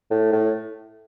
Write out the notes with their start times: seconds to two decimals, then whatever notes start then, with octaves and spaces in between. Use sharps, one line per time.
0.10 A2
0.32 A2